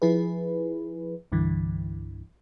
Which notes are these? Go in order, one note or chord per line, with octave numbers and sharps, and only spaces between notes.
F3 E4 G#4 B4
C2 G2 D3 E3